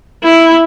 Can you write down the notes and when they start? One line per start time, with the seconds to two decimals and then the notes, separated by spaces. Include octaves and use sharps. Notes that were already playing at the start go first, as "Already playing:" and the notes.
0.23 E4